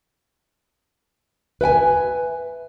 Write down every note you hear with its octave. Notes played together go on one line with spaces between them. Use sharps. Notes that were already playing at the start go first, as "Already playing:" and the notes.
B4 E5 G5 G#5